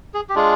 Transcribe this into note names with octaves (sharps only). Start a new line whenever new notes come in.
G#4
G4
G#3 D4 F4 G#4